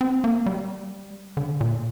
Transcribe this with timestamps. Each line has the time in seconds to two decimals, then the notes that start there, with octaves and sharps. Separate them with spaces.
0.01 C4
0.24 A#3
0.46 G3
1.37 D3
1.61 A#2